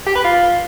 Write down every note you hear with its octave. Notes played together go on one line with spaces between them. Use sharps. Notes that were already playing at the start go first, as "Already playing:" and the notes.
G4
B4
F4